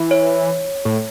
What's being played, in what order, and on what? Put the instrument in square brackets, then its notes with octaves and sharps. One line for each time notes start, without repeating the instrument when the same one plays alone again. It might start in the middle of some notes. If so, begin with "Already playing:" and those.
Already playing: [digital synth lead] E3
[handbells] C#5
[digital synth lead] A2